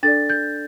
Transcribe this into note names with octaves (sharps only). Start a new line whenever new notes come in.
D4 A4 D5 A6
G6